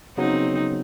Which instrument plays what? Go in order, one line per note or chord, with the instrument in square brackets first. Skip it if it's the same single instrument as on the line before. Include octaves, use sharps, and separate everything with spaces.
[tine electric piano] C#3 F#3 B3 [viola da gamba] C4 D#4